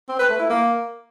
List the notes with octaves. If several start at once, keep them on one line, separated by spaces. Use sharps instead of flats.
C4
B4
A3
E4
A#3